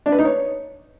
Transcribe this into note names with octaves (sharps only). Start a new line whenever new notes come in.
D4
B4
D#4
C#5